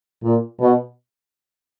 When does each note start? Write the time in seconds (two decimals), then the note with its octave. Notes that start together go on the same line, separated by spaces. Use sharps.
0.23 A#2
0.60 B2